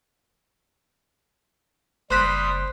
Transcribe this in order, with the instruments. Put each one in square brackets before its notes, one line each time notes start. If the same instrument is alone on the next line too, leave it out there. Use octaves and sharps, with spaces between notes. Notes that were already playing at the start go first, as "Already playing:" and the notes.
[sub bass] F#1 [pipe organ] G3 D#6 [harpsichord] C5 B5 [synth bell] C6 F#6